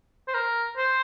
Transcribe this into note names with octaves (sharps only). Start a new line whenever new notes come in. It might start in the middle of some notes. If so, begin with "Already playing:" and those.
C5
A#4
C5